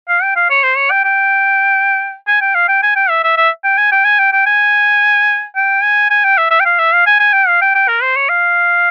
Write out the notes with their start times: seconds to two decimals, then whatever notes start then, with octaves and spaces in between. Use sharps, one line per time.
0.09 F5
0.23 G5
0.36 F5
0.50 C#5
0.63 C5
0.77 C#5
0.91 G5
1.04 G5
2.28 G#5
2.41 G5
2.55 F5
2.68 G5
2.83 G#5
2.96 G5
3.09 E5
3.24 E5
3.37 E5
3.64 G5
3.78 G#5
3.92 G5
4.05 G#5
4.19 G5
4.32 G5
4.46 G#5
5.56 G5
5.83 G#5
6.10 G#5
6.24 G5
6.38 E5
6.51 E5
6.60 G5
6.65 F5
6.79 E5
6.93 F5
7.06 G#5
7.20 G#5
7.33 G5
7.48 F5
7.62 G5
7.75 G5
7.88 A#4
8.02 C5
8.16 C#5
8.29 F5